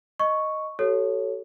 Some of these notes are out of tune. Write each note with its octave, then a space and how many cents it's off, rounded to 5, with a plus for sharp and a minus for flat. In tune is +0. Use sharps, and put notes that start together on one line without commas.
D#5 +0 C#6 +0
F#4 +45 A4 +0 C#5 +0